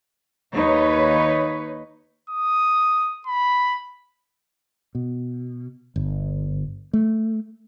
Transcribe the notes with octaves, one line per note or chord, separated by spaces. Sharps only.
D#2 D#4 B4 C#5
D#6
B5
B2
G1
A3